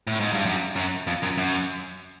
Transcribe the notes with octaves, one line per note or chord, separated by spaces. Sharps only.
A2
G#2
G2
F#2
F#2
F2
F#2
F#2